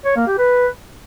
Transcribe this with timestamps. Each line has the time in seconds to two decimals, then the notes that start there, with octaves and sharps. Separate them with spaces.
0.05 C#5
0.16 A#3
0.27 G4
0.38 B4